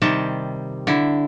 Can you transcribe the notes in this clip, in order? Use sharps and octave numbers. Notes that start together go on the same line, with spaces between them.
C3 D#3 G3 A5
D3 E4